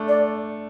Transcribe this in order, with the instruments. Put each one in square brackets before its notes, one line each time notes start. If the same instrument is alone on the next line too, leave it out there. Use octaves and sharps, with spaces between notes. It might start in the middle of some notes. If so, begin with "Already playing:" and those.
Already playing: [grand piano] A3 D4 A4
[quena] D5